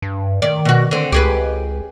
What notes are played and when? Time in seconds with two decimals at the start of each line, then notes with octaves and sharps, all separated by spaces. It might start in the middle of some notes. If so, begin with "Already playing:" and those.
0.02 G2
0.42 D#3 D5
0.65 B2 F#4
0.91 D3 C4
1.12 C#2 G4 G#4 B4